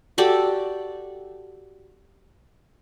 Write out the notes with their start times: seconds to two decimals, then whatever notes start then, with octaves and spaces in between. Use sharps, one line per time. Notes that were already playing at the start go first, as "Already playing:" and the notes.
0.18 F#4 G4 A4 D5